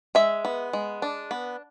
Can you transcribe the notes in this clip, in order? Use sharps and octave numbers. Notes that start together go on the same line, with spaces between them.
G#3 E5
B3
G#3
D4
B3